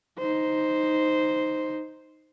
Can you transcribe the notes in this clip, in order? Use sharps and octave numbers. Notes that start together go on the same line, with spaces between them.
D#4 C5